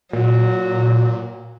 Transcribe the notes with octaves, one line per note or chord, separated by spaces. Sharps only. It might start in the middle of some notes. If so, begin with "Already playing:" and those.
A#2 F#3